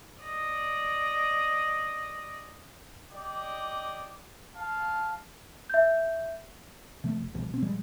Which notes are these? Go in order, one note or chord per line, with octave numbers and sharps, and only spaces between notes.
D5 D#5
G4 D5 D#5
F5 A5
E5 G6
C3 F3 A3
F#1
C2 B2 F3
B2 C4
A#2 F3 G3 G#3